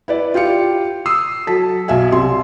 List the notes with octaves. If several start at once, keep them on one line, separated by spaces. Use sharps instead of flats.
E4 B4 D5
F4 G4 F5 C#7
D#6 E6 C7
F#3 A4 A5 B6
B1 F#3 E5 F5 G#5
C2 C3 C6